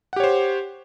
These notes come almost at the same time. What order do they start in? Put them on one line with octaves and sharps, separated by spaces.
F#5 G4 C#5 C5